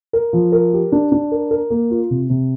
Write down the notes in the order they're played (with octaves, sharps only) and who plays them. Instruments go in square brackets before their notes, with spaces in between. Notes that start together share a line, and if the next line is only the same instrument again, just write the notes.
[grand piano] A#4
F3
A#4
G4
D4
D4
A#4
A#4
A#3
F4
C3
C3